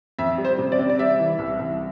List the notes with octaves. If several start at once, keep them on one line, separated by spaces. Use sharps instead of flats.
F2 E5
G3
C5
C3
D5
C3
D5
G3 E5
E3
C2
C2